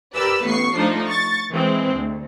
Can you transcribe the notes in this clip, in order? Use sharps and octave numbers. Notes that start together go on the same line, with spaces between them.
G4 A#4 B4 D5 E6
A1 B3 C#6 C7
F3 A3 D4 D#4
C#6 A6
E3 G#3 C4
D2